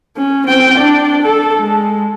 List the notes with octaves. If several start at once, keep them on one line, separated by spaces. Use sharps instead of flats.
C#4
C4 G5
D4 D5
A4
G#3